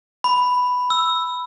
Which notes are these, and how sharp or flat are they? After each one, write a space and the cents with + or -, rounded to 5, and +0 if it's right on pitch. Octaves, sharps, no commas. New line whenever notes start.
B5 +5
E6 +0